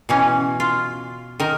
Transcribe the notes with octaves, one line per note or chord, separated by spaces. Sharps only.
B2 E3 C#4
F4
D#3 A#4